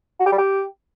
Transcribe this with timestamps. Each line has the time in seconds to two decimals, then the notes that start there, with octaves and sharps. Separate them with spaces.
0.20 F#4
0.26 G4
0.32 G3
0.38 G4